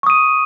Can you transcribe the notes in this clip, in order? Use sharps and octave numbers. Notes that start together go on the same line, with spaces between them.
C#6 D#6 D#7